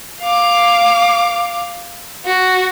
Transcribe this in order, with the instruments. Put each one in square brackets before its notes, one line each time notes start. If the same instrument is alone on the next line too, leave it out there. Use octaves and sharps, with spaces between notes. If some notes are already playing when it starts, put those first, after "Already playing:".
[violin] F5 D6
F#4